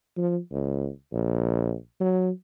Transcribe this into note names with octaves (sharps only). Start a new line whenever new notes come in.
F3
C#2
A#1
F#3